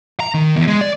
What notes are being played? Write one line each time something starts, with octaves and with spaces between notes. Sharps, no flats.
A#5
D#3
E2
G#3
D5